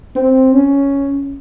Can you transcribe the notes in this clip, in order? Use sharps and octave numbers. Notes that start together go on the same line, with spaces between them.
C4
C#4